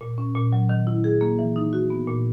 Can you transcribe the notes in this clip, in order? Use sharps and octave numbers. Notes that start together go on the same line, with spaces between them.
A#2
C#4
A#2
F#3
D#3
E4
G#4
A#3
E3
D#4
F#4
B3
A#2